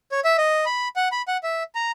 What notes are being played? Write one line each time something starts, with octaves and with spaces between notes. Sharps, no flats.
C#5
E5
D#5
B5
F#5
B5
F#5
E5
A#5